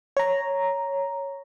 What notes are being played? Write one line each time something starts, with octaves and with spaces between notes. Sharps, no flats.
C#5 A#5